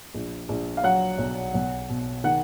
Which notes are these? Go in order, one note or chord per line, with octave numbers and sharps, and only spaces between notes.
A#1
A#1
F5
F#3 F#5
B1
B1
B2
D#3 F#5